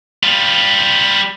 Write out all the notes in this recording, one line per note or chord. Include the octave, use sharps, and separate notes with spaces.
G3 F4